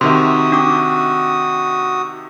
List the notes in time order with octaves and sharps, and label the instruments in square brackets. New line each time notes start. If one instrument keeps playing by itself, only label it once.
[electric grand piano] C3 D#3 E5 [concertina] F#4 D#6 [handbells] C6
[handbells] D4 D6